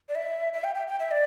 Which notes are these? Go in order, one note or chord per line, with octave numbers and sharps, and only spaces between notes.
D5
E5
E5
G5
G5
G5
E5
D5